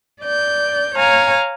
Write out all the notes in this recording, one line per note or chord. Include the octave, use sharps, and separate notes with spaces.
D5 G6
C#5 F5 G#5 A#5